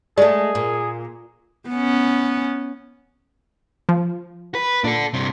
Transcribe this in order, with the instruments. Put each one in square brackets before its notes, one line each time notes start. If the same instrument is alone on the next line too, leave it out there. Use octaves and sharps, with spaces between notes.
[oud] G#3 A3 [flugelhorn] G#4 [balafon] D5
[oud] A#2
[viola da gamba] B3 C#4
[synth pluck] F3
[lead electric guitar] B4
[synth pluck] A#2 [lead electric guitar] D4 A4
[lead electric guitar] G2 C3